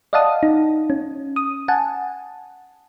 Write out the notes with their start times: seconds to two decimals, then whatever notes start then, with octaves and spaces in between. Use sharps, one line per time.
0.13 D5 D#5 F5 F#5 A5 D#6
0.43 D#4
0.90 C#4
1.36 D#6
1.68 F#5 G#5 A5